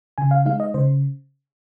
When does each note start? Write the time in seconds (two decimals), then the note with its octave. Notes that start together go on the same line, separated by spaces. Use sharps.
0.18 C#3 G#5
0.31 F5
0.46 G#3 D#4 F5
0.60 D#5
0.74 C#3 C5